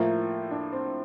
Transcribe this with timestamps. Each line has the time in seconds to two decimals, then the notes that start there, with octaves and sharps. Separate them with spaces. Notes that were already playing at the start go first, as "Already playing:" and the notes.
Already playing: A2 F3 A#3 E4 F4
0.51 D4
0.72 C4